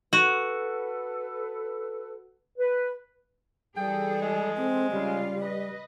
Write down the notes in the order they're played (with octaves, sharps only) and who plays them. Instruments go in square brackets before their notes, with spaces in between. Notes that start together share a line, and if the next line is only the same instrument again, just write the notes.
[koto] F#4 [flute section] A4 B4
[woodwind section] B4
[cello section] E3 G#4 A4 [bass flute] G3 [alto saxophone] G5
[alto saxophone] G#3
[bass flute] C4
[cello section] C#3 F4 F5 [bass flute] G3
[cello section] B4 D#5